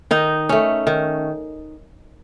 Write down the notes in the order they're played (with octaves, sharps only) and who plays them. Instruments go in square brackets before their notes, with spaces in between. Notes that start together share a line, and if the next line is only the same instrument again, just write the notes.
[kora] D#3 D#4
A3 C#4
D#3